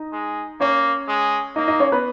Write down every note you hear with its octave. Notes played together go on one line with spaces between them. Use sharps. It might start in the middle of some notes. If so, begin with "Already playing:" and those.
Already playing: D#4 D#5
G#3
A#3 C#4 C#5
G#3
A#3 D#4 D#5
D#4 D#5
C#4 C#5
B3 B4